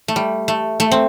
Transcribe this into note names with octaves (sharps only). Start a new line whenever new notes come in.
A3
G3
A3
A3
C4